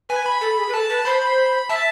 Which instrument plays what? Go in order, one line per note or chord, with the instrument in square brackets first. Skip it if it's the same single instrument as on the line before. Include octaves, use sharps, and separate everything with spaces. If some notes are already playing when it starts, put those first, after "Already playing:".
[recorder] B4 [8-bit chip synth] G#5
[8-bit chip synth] B5
[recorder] A4
G#4
B4
[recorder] A4 [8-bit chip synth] A5
[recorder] B4
[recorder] C5 [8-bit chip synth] B5
[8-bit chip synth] B5
[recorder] E5 [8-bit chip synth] A5